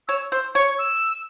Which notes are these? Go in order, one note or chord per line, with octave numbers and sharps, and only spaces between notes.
C#5 E6
C5 E6
C#5 C#6
E6